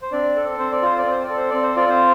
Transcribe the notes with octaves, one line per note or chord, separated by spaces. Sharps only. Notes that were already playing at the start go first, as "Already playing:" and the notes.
C5
C4 D4 D5
A4
C4 C5
D5
F4 C5
D5
C4 C5
D5
A4
C5
C4 D5
C5
F4 D5
C4 C5